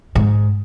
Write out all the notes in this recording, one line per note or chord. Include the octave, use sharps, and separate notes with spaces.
G#2